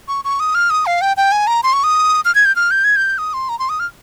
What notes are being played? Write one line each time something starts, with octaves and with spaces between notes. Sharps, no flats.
C#6
C#6
D#6
F6
D#6
F5
G5
G5
G#5
A#5
C6
C#6
D#6
F6
G#6
G6
F6
G6
G#6
G6
D#6
C6
A#5
C6
D#6
F6